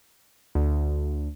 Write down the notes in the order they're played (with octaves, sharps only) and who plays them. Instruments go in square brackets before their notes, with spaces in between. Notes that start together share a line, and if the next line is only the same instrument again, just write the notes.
[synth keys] D2